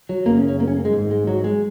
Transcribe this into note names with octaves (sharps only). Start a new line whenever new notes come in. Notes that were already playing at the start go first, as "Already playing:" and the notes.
F#3
F#1 F#2 C#3 A#3
C#4
C#4
A#3
C#4
A#3
G#3
G#1 G#2
G#3
F#3
G#3